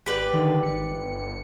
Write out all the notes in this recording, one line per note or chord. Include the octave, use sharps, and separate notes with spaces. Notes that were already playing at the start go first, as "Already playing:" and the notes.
G#1 G4 B4 D5
D3 D#3
G#1 C#7
G1